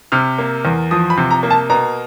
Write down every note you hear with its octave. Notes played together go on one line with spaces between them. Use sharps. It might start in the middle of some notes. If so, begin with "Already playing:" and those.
C3 F6
A#3
E2
F3 D#6
B5
C3
A#5
A#3
A5
B2 A#5